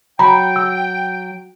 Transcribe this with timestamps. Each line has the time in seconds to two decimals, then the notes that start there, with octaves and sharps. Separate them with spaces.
0.19 F#3 G5 A#5 B5
0.56 E6